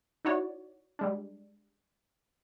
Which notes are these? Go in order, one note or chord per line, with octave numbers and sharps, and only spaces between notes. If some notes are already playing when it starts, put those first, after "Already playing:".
D#4 E4 F#4 C#5 D5
G3 G#3 D4